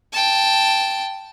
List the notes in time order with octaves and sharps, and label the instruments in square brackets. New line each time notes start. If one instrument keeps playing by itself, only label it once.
[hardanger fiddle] G5 A5